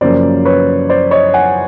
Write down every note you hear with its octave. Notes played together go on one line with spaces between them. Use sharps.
F#2 C#3 F3 A#3 C#4 C5 D5
B4 C#5
C5 D5
C#5 D#5
F#5 G#5